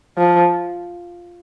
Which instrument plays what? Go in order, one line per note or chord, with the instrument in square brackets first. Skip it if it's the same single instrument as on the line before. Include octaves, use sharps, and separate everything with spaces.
[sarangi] F3